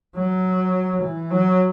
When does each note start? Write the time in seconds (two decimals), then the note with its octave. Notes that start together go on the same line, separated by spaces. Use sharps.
0.16 F#3
1.02 E3
1.31 F#3